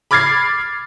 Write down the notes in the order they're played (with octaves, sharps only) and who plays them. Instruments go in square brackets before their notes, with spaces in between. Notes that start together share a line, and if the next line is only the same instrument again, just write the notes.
[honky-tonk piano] B5 D6 F6 G#6 A6 C7